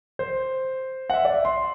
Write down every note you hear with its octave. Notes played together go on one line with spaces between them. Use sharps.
C5
F#5
E5
D5
E5
C6